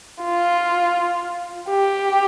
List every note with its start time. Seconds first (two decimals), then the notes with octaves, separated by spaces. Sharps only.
0.23 F4
1.70 G4